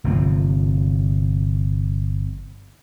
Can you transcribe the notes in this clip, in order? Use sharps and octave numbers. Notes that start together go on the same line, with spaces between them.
G1 C3 F3 C4